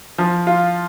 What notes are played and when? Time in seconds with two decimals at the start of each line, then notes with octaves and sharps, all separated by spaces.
0.18 F3
0.47 F4